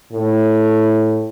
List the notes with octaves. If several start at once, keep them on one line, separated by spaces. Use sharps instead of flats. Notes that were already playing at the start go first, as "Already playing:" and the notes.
A2